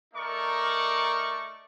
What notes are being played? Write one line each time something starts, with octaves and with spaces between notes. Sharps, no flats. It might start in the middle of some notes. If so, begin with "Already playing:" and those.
A3 D#4 A#4 D5 C#6